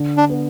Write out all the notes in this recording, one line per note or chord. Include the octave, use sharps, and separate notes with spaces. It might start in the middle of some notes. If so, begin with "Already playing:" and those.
Already playing: D3
D4
B3